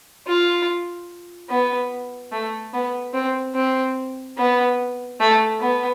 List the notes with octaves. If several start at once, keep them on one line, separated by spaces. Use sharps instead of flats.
F4
B3
A3
B3
C4
C4
B3
A3
B3